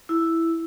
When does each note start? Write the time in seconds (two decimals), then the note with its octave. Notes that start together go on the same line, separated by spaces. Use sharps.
0.09 E4